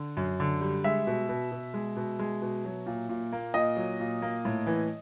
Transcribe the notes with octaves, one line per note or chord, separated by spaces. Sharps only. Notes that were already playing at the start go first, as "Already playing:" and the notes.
Already playing: D3
F#2
D3
G3
G#3 E5
B2
B2
B2
G#3
B2
G#3
B2
F#3
A#2
A#2
A#3
A#2 D#5
F#3
A#2
A#3
A2
E3